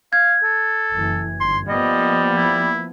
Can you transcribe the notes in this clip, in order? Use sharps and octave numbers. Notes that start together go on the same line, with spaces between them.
F5 G#6
A4
F#1 E3
G1 C6
F3 G3 A#3 B3 D#5
E4